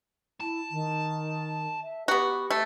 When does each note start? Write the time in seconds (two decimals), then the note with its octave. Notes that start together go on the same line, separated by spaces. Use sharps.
0.41 E4 A5
0.71 D#3
1.82 E5
2.08 B3 F#4 G4
2.50 A3